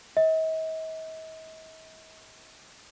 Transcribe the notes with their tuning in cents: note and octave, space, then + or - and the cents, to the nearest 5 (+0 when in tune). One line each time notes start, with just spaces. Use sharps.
D#5 +45